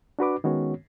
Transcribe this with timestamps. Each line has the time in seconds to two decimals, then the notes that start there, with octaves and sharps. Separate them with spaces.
0.19 D4 F#4 B4 D6
0.44 D#3 G#3 B3 C#4 F#4 C#5